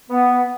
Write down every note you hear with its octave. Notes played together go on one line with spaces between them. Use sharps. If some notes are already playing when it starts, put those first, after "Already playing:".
B3